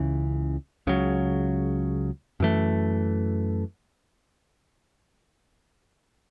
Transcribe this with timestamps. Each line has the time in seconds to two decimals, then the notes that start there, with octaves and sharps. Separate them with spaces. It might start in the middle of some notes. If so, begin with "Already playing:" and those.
Already playing: C#2 C#3 E3
0.87 C#2 C#3 F#3
2.40 F#2 E3 A3